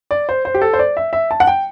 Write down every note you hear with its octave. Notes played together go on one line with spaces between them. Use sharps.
D5
C5
C5
G4
A4
C5
D5
E5
E5
A5
F#5
G5